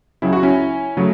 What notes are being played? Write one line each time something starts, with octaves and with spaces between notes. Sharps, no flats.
C#2 C#3 F#3 E4
F#4
C#4 E4
C#3 F#3 A3